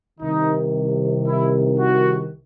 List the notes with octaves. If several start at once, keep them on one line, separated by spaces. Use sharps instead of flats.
C2 C3 D#3 D#4
E4
F#4